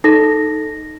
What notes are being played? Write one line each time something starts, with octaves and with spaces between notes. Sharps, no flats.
D#4 A4 A#6